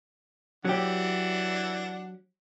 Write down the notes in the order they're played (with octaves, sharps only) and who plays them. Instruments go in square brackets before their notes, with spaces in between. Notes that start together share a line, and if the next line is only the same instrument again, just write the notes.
[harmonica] E3 D4 F#5 [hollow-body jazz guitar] F#3 G4